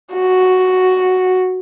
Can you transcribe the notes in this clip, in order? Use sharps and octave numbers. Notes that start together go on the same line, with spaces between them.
F#4